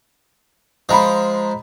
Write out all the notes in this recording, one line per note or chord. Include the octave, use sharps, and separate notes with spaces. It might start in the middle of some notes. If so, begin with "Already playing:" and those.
F3 G#3 D#5 A#5 B5